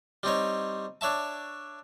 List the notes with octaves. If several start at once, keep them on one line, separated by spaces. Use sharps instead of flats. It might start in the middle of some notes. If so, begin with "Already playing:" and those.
G3 C4 D#4 C#5
D4 C#5 E5 A5